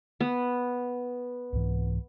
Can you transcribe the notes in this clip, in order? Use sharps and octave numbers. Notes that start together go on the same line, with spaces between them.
B3
C2 G#2 E3